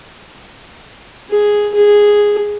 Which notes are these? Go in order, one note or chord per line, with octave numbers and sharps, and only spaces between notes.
G#4
G#4